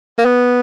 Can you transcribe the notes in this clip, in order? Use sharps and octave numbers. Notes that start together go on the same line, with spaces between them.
A#3
B3